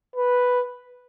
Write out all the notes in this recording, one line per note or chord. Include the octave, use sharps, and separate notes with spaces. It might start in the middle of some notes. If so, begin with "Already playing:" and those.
B4